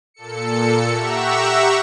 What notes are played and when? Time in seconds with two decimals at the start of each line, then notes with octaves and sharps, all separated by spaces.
0.14 A#2 A4 C#7
0.91 G4 E5 F#5 A#5 C#6 E6